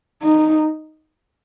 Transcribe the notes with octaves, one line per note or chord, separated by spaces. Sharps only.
D#4